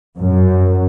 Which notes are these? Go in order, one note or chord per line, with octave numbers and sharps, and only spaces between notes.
F#2